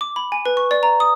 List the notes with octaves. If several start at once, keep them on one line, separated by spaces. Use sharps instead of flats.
D6
B5
G#5
B4
C#6
D5
A#5
D#6